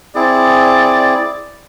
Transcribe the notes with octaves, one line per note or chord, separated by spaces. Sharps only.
C4 E4 G#4 D5